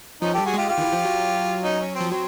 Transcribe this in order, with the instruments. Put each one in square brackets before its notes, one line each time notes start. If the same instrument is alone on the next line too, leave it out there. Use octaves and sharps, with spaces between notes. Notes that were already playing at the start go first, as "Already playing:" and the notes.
[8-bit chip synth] F3 [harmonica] C#4 D#4
[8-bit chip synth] G3 [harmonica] G4 A4
[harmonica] F#4 G#4
[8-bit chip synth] G#3 [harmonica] F4 G4
[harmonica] F4 G4
[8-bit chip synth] D#3
E3
F3
F#3
[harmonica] C#4 D#4
C#4
C4
[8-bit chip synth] F3
[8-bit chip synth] F#3 [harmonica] C4